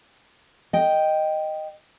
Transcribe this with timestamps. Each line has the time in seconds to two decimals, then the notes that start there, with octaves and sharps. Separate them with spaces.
0.73 D#5 G5